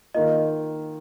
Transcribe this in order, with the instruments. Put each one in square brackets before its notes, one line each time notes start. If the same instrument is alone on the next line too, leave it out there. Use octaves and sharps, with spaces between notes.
[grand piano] D#3 A#3 F4 [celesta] D#5